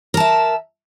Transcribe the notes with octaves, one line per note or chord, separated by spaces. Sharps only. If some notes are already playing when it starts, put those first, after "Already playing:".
A#4 E5 A5